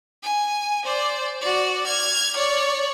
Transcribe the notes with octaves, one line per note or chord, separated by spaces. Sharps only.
G#5
C5 D5
F#4 D5
F6 G#6
C#5 D5